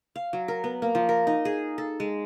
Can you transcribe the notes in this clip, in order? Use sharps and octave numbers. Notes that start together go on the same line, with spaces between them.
F5
F#3
A#4
B3
A#3
F3
A#4
D#4
G#4
A4
G#3